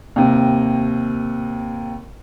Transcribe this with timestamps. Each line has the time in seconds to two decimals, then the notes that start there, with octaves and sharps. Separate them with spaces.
0.16 D#2 C3